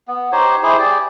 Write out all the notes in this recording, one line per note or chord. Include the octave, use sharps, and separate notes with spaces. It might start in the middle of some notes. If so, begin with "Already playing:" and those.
B3
D#4 G4 C5 C#5
E4 G4 G#4 C5
G4 G#4 D5